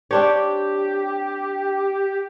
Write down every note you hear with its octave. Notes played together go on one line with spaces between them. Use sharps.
C4 D4 G4 C#5